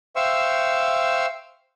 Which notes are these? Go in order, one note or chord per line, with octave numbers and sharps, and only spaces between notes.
C5 E5 F5 G5 C#6 E6